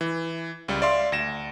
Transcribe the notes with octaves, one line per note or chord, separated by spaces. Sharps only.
E3
C#2 G3
D5 E5 F5 C6
D2 A#6 E7